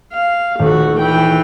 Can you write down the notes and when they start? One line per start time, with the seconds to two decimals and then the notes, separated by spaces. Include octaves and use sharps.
0.13 F5
0.59 D#1 A3 F#4
1.00 E3 G5